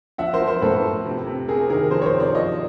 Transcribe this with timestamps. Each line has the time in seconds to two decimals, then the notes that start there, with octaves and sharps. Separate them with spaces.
0.18 F3 E5 F#5
0.33 A#4 C5
0.41 F3
0.48 A#4 C5
0.62 A2 A4 B4
0.83 F3
1.06 C3
1.26 C3
1.48 C3 G#4 A#4
1.70 D#3 G#4 A#4
1.91 F3 A#4 C5
2.02 C#5
2.06 A#4 C5
2.13 C3
2.20 C5 D5
2.34 F3 C#5 D#5